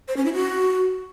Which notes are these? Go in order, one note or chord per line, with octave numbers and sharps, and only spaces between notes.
C5
C#4
E4
F#4